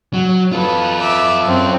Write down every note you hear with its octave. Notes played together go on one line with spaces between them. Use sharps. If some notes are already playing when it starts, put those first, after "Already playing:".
F#3
F4 A4 B4
E5 D6
F#2 C4